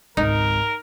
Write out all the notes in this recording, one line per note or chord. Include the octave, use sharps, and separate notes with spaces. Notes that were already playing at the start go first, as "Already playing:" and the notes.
G#1 C#2 D#4 A#4